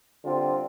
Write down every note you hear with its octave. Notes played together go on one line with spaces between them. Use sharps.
D3 G3 C4 F4